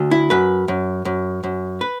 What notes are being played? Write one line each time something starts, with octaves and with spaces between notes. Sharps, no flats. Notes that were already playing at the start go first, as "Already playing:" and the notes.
Already playing: D2
E4
F#2 B4
F#2
F#2
F#2
B4